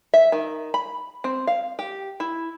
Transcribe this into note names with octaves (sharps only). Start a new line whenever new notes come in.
E5
D#3
B5
C4
F5
G4
E4